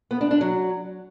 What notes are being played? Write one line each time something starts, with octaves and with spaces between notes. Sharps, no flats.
B3
D4
D4
F#3